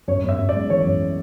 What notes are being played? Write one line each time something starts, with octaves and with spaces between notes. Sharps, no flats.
F#2 C#5
F#2 E5
F#2
D5
G#3
E3 C#5
F#2